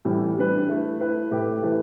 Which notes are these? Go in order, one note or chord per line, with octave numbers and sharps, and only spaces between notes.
A2 E3 G3
G3 D4 B4
A3 E4 A4
A3 E4 B4
A2 A3 G4 B4
E3 A3 E4 B4